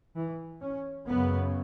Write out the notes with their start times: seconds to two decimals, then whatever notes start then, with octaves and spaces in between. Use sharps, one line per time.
0.16 E3
0.62 C#4
1.07 F#2 C#3 B3